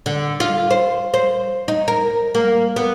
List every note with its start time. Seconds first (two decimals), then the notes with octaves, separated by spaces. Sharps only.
0.06 D3
0.40 F4
0.71 C5
1.14 C5
1.68 D#4
1.88 A#4
2.35 A#3
2.76 B3